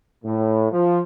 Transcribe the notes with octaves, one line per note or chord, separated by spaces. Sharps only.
A2
F3